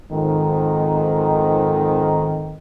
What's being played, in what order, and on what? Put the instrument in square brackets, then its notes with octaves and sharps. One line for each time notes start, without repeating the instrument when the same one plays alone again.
[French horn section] F2 G#2 D#3